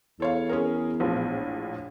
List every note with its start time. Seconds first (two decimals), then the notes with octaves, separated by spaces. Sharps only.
0.20 E2 A4 C#5 F5
0.49 C#4 G#4 A#4
1.00 A#1 A2 F3